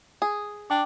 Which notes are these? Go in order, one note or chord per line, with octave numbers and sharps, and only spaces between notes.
G#4
D4 G5 D6